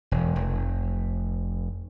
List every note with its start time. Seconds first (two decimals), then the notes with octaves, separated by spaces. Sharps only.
0.11 E1
0.36 F1